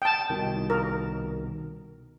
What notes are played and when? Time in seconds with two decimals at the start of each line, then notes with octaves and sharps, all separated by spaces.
0.02 G5 A5
0.29 C2 B2 D#3
0.70 A#4